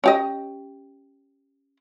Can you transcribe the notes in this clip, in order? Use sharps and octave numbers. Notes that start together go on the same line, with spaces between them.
C#4 G4 D#5